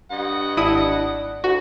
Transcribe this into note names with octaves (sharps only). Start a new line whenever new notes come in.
G2 D#5 F#5
G#1 D4 E4 D#6
D2 F#4